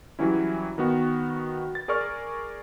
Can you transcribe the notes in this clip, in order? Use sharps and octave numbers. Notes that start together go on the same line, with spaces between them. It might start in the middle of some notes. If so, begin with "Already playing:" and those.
E3 F#3 G3 C#4 E4
D#3 B3 F#4
A6
G#4 A#4 D5 C#6 F6